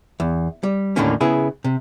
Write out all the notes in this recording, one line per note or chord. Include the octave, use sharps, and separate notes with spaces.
E2
G3
D#2 A2 D3 D#3 A#3 C#4
C#3 B3 E4 G#4
C3